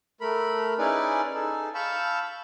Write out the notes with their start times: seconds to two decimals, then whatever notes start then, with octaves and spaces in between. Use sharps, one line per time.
0.21 A3 A#4 B5
0.79 C#4 D#4 E4 G#4 B4 D5
1.34 D#4 G#4 A4
1.75 F5 A5 B5 C#6 E6 G6